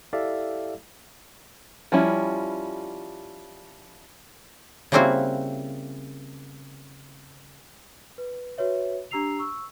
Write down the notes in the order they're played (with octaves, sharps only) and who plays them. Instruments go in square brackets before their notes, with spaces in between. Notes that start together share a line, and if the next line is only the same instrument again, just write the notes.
[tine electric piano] E4 G4 A4 D5 E5 F5
[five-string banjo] F3 G3 C#4 E4
[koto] C#3 G3 A#3 C4 E4 F#4
[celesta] B4
F#4 B4 C#5 E5
D4 G4 A#5 E6 C7 F7
C#6 E6